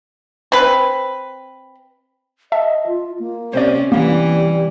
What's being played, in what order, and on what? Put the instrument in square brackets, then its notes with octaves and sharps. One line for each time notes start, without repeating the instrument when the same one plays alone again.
[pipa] C4 B4
[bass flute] D#5 [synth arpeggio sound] E5 A5
[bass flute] F4
A#3
[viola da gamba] C3 C#4 [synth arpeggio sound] C5 D5
[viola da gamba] E3 [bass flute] G3 [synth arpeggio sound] A#3